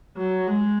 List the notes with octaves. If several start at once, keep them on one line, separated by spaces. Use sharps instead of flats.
F#3
G#3